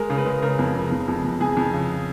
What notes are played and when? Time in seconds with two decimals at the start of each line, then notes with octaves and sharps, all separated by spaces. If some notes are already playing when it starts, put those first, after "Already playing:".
Already playing: G#3 A#4
0.10 C#3
0.18 B4
0.26 G#3
0.42 C#3 A#4
0.59 F2
0.75 C#3
0.92 F2
1.08 F2
1.24 F2
1.40 F2 G#4
1.57 F2
1.73 C#3